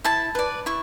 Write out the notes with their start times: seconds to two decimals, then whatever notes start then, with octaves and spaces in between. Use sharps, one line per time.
0.04 E4 A5
0.35 B4 D5
0.66 E4 C#6